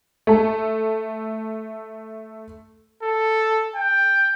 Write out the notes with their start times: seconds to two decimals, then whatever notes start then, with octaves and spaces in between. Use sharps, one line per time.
0.27 A3 A4
3.03 A4
3.76 G5